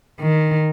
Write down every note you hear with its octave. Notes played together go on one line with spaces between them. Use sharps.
D#3